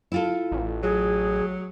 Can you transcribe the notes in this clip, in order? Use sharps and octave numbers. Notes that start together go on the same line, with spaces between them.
E4 F4 A4
A1
F#3 G#4